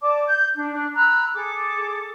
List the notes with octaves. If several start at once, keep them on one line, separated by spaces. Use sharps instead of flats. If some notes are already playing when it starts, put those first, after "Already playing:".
D5 A5 D6
G6
D4
D4
A#5 B5 E6 F#6
G#4 A4 D6